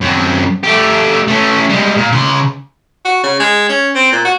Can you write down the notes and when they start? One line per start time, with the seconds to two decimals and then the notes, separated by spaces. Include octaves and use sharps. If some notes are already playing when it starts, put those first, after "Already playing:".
0.01 F#2 C4
0.63 A3 G4
1.28 A3 C#4
1.69 G3 G#3
1.97 A#2
2.12 C#3 C6
3.05 F#4
3.23 C#3
3.40 G#3
3.69 C#4
3.95 C4
4.12 A#2
4.25 F#4